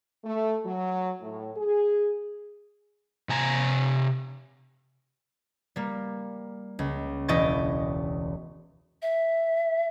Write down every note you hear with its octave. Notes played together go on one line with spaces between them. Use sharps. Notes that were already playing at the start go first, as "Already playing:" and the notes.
A3
F#3
A2
G#4
C3 G#5 A#5
G3 A#3
C#2
E1 E4 D#5 G5 C#6 A6
E5